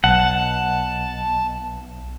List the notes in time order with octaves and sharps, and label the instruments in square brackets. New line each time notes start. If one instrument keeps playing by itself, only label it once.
[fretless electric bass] B1 [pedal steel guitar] F#5 [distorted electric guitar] A5